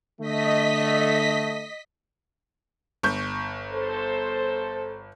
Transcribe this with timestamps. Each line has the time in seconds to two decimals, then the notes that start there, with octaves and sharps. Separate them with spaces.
0.21 D3 A3 D#5 B6
3.03 G1 C#6 G6
3.72 A4 C5